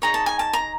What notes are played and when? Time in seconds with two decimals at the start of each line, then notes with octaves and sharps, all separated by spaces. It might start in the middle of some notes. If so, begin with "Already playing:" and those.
0.02 D#4 G#4 C#5 A#5
0.14 A5
0.26 G#5
0.39 A5
0.53 A#5